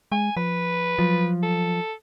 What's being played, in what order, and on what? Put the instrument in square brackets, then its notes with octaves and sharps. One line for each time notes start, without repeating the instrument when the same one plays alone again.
[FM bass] G#3 [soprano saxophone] G#5
[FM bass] F3 [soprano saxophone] B4
[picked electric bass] F3 [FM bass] F#3
[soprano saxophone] A4